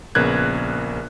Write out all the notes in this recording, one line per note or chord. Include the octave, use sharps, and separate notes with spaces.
A#1 C#3 B3 A#4 F#6 G#6